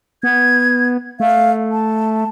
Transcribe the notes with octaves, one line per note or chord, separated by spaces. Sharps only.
B3 G#6
A3 F5
A5